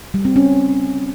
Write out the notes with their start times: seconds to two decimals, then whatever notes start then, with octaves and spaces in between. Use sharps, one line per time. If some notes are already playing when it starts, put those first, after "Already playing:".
0.14 G3
0.25 C4
0.36 C#4